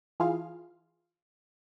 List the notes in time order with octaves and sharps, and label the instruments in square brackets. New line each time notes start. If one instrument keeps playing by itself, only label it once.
[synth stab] E3 F4 G#4 F5